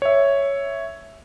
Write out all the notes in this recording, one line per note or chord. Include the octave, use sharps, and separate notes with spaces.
C#5 E5